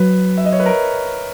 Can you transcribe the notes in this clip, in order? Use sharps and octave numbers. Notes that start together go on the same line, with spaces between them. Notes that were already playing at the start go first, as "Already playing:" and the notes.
Already playing: F#3 B4
E5
D#5
C#5
B4
A#4